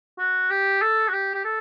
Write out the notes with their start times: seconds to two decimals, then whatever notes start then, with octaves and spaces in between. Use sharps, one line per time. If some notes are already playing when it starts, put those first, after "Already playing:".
0.19 F#4
0.50 G4
0.82 A4
1.09 F#4
1.13 G4
1.34 G4
1.45 A4